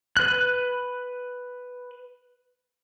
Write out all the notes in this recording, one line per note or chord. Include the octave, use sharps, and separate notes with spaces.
B4 F#6